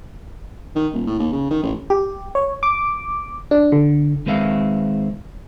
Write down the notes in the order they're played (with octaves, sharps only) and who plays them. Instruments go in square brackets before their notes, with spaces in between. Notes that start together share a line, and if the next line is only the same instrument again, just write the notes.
[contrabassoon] D#3
D#1
A2
D#2
C#3
D#3
A1
[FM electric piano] G4
C#5
D6
D4
D3
[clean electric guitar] D#3 G#3 C4 B4 E5 F5